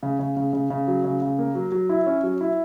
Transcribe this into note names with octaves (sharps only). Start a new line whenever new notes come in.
C#3
C#3
C#3
C#3
C#3
F#3
C#3
C#3
A#3
F#3
F#3
E4
C#4
F#3
E4